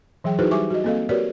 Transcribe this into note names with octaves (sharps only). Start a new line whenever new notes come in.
E3 F#3 G#4 G5
D#4 E4 F#4 G#4 B4 C5
G3 G4 E5 G#5 C#6 D6
F#4 D#5
A#3 C4 A4 D#5 F5
F#4 G4 A#4 B4 C#5 D5